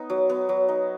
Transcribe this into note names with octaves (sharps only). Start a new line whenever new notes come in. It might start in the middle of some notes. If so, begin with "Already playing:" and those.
Already playing: B3 D#4 D#5
F#3
B3
F#3
D#4